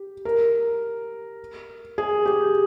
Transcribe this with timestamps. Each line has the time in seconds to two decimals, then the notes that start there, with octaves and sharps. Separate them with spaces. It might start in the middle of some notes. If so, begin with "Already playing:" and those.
Already playing: G4
0.25 A#4
1.98 G#4
2.26 G4